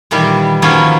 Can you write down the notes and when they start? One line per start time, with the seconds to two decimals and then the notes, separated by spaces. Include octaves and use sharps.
0.11 A#2 D#3 E3 G3
0.62 D#3 F3 F#3 A#3 B3 C#4